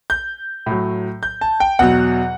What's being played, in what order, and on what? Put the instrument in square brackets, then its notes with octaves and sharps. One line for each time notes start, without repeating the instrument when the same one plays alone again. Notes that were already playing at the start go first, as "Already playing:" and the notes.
[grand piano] G6
A2 F#3
G6
A5
G5
E2 B2 F#3 F#5